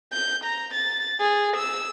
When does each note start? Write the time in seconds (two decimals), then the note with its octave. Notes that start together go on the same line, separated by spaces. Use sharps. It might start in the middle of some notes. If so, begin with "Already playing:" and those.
0.13 G6
0.44 A#5
0.74 A6
1.20 G#4
1.57 E6